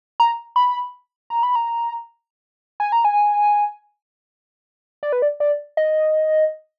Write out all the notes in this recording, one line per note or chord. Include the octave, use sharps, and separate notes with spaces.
A#5
B5
A#5
B5
A#5
G#5
A#5
G#5
D5
B4
D5
D5
D#5